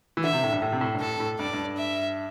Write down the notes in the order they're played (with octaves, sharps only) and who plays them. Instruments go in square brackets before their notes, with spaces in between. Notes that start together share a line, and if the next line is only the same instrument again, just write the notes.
[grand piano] E3
[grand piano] D3 [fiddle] E5
[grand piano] C3
A2
G2
A2
C3
A2
G2
[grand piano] A2 [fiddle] A4
[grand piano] A2
[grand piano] G2 [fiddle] D5
[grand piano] G2
[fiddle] E5